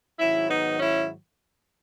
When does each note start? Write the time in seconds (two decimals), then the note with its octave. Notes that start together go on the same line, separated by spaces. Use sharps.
0.19 G#2 D#3 F#3 C#4 E4
0.49 B3 D#4
0.79 C#4 E4